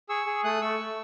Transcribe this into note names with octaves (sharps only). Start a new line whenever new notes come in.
G#4 C#6 E6
G#4
A3 D#6 F#6
A3 C#6 E6
A3